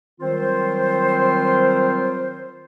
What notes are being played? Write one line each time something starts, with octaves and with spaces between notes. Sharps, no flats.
D#3 F#3 G3 C4 F4 C5